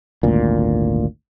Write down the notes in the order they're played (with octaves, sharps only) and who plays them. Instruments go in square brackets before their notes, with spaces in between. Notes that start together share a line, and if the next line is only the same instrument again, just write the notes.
[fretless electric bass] G#1 D2 A#2